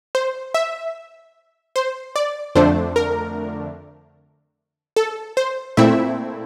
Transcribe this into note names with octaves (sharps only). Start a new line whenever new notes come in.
C5
E5
C5
D5
F2 D3 A3 D4 C5
A#4
A4
C5
A#2 A3 C4 E4 E5